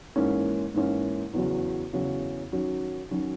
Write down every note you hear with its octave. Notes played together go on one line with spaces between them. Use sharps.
G#2 E3 A#3 C#4
G#2 E3 A#3 C#4
E2 C#3 F#3 C#4 F#4
E2 C#3 F#3 C#4 F#4
D#3 F#3 C#4 F#4
D#3 F#3 C#4 F#4